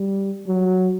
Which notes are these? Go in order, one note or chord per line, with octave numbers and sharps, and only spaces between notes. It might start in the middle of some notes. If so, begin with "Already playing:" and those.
Already playing: G3
F#3